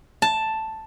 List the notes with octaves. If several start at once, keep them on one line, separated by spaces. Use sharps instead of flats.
A5